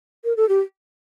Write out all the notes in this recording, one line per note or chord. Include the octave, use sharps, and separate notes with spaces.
A#4
A4
G4